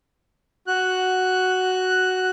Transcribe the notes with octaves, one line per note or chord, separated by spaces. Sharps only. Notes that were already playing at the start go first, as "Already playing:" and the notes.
F#4 F#6